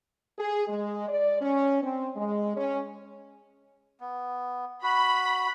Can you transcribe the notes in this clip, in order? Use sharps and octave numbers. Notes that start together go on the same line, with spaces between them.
G#4
G#3
D5
C#4
C4
G#3
C#4
B3
F#4 B5